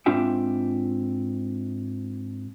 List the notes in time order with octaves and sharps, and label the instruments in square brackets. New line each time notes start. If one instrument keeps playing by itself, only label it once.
[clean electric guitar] G#2 C4 D4 F4 E5 G5